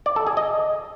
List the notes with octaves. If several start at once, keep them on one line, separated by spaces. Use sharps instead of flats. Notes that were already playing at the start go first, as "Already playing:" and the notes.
D5
A4
G#4
D#5